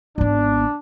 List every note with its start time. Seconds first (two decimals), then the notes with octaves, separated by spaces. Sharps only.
0.18 G#1 B3 D4